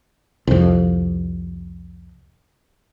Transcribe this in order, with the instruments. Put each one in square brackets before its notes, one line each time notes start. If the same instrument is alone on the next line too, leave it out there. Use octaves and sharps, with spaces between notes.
[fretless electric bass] C2 F2